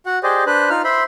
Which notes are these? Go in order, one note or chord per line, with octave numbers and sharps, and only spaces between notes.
F#4 F#5
G4 G#4 C5 D5 D#5
D4 B4 C5 F#6
D#4 F4 F6
C5 E5 B5 C6